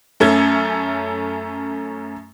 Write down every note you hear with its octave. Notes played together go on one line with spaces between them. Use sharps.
F#2 A3 C#4 G#6